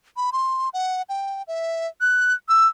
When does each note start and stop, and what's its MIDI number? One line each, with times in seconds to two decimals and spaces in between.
0.17 0.30 83
0.32 0.69 84
0.74 1.02 78
1.09 1.42 79
1.48 1.87 76
2.01 2.34 90
2.49 2.67 88